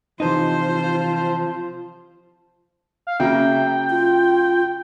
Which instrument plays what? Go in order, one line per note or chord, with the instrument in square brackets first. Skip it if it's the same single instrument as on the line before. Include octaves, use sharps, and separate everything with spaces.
[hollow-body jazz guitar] C3 E3 D#4 [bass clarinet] F3 [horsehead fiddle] F4 [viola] C5
[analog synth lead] F5
[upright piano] C#3 F#3 A#3 [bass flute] E5 [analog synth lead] G5
[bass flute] F4